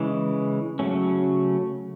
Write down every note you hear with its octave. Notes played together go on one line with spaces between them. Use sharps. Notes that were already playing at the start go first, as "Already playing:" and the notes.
Already playing: C#3 E3 G#3
C#3 F#3 A3 C#4